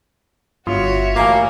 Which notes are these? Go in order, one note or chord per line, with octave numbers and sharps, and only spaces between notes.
G1 F4 F#4 C#5 E5
A1 A#3 A#5 D6